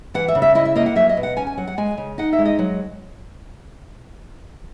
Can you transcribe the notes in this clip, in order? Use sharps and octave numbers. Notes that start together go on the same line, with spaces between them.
E3 F#5
E5
C#3
E5
E4 D#5
E5
A#3 D#5
F#5
F#3 E5
D#5
B2
F#5
C#4 G#5
G#5
F#3 F#5
F#5
G#3 G#5
C#3
D#4 F#5
E5
G#3
D#5
F#3